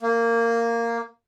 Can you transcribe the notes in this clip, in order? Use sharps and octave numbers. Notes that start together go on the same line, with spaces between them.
A#3